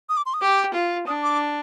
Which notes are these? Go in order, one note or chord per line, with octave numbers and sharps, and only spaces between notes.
D#6
D6
C6
D#6
G4 D6
F4
D4 D#6
D6